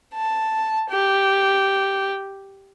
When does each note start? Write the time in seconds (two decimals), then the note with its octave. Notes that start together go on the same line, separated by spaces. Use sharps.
0.14 A5
0.90 G4